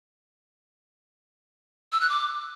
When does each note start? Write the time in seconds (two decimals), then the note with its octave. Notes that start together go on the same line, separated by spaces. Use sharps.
1.92 E6
2.01 F#6
2.09 D6